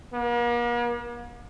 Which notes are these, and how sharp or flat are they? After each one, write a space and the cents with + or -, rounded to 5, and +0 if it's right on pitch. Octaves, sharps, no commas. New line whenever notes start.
A#3 +45